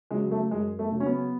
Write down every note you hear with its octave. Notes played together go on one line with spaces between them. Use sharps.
C#3 F#3 G#3
A3
F#2 G#3
A3
C#3 F#3
C#4
B3